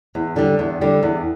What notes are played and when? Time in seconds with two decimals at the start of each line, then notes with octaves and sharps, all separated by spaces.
0.15 E2
0.36 D3 G3
0.59 E2
0.81 D3 G3
1.03 E2